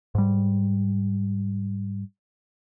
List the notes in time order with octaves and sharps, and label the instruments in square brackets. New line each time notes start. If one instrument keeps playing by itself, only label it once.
[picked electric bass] G#2 G3